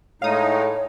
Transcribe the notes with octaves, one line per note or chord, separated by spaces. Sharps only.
A2 G#3 D#4 C#5 F5 D#6